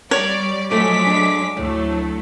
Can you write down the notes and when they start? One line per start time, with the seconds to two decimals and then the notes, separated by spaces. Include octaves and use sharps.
0.11 G3 C#5 D5
0.71 F3 F#3 G#3 A3 D6 B6
1.06 D4
1.57 D2 A2 F#3 A3